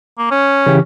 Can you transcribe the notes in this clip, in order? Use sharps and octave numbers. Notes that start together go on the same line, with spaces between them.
A#3
C#4
C#3 E3 G4